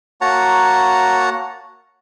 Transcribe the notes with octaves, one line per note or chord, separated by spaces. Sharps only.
A#3 F#4 C#5 F#5 A5 A#5